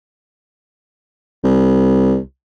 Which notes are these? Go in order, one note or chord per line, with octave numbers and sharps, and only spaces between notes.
C2